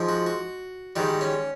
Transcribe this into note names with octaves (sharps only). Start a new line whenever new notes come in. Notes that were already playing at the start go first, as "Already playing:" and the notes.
Already playing: G#2 F3
F#4
F#4
G#2 D#3 G3 F#4
C#4